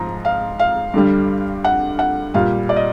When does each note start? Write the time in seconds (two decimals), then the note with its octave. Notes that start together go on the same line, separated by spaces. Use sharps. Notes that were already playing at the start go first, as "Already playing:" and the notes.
Already playing: G#2 F3 A#5
0.25 F5
0.59 F5
0.94 G2 D3 G3
1.64 F#5
1.99 F#5
2.34 A#2 G3 F5
2.69 D5
2.76 D#5